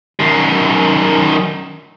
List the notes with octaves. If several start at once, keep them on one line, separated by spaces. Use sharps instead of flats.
F#2 D#3